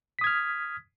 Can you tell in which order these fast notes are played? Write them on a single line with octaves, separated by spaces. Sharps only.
B6 D#6 G#6 F6